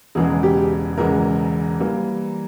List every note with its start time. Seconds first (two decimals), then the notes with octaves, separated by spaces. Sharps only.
0.15 E1 E2 C#3 E3 G#3 G#4
0.43 G4
0.98 E1 E2 C#3 E3 G#3 A#4
1.80 E3 G3 A#3